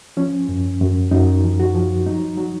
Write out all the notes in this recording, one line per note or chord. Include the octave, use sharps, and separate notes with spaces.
F3 C#4
F#2
F#2
F#2 D#4
F3
F#4
F3
F#3 D#4
F#3